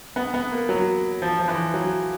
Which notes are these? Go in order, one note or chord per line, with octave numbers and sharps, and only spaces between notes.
B3
B3
A#3
F#3
F3
F3
E3
F#3